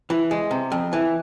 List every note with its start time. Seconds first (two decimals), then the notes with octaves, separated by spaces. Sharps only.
0.10 E3
0.31 G#3
0.51 C3
0.72 F2
0.93 E3